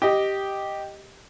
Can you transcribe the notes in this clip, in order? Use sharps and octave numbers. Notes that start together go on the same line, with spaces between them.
G4 D#5